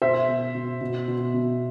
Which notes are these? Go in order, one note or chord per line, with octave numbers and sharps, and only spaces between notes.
B2 C5 E5
B2
B2
B2
B2
B2